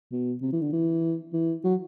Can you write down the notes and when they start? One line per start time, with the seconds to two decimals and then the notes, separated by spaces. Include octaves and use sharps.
0.12 B2
0.42 C3
0.53 E3
0.62 D3
0.73 E3
1.33 E3
1.64 F#3